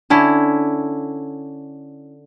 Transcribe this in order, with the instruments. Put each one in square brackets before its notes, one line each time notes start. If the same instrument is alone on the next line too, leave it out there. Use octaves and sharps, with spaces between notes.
[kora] D3 C#4 E4